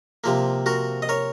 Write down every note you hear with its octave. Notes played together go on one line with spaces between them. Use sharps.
C3 F3 A#3
F#4 A#4
D#5
A#4 C#5